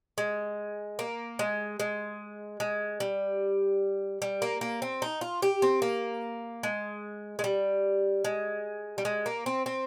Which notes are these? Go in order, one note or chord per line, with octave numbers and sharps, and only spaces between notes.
G#3
A#3
G#3
G#3
G#3
G3
G3
A#3
A#3
C4
D#4
F4
G4
C4
A#3
G#3
G#3
G3
G#3
G3
G#3
A#3
C4
C4